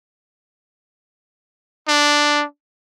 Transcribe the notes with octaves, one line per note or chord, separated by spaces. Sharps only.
D4